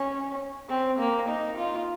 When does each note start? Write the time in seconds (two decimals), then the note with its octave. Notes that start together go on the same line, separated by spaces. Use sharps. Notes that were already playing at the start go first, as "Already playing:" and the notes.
Already playing: C#4
0.70 C4
0.99 A#3
1.29 D#4
1.58 F4